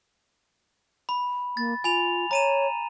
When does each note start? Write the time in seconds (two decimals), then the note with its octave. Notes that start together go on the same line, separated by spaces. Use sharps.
1.09 B5
1.57 A#3 A6
1.84 F4 G#5 B5 F7
2.31 C#5 A#5 D#7 E7